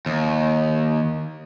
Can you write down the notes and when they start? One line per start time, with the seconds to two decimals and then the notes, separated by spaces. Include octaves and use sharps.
0.06 D#2